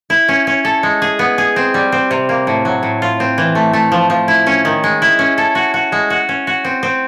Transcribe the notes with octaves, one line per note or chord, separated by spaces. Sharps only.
E4
C#4
C#4
A4
G#3
G#4
B3
G#4
C4
G3
C4
C3
A#3
A2
F#3
A2
F4
C4
E3
A3
A3
F3
F3
E4
C#4
D#3
G#3
E4
C#4
A4
F#4
F#4
G#3
F#4
C#4
F#4
C4
C4